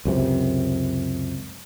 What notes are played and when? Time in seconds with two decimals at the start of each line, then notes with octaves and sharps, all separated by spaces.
0.05 C#2 F#2 C3